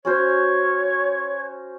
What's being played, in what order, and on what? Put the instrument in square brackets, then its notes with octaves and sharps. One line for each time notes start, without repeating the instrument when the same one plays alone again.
[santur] C#4 F#4 C5 [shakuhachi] C#5